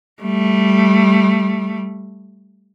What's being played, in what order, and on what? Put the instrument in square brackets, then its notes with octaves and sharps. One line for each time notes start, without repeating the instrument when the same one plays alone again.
[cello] G3 A3